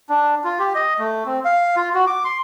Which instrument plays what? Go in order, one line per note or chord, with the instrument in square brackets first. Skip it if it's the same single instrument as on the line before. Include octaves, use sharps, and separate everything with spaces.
[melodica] D4
F4
G4
D#5
A3
C4
F5
F4
F#4
D6
C6